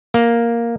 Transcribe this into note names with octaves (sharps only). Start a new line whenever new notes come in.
A#3